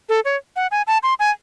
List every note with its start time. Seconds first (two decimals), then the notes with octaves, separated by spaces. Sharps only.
0.09 A4
0.25 C#5
0.56 F#5
0.71 G#5
0.87 A5
1.03 C6
1.19 G#5